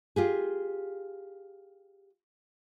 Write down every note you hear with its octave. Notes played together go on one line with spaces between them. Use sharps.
F4 G4 G#4